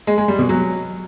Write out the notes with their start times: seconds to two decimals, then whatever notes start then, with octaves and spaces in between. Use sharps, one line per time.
0.07 G#3
0.18 G#3
0.28 G3
0.39 B2
0.49 F#3